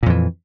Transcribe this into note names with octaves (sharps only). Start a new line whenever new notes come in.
F2 A#2 E3